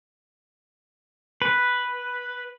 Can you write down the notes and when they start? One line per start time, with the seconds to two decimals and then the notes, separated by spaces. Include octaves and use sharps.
1.42 B4